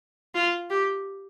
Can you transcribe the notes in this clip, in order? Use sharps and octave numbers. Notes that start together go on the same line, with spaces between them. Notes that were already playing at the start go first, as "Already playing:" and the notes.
F4
G4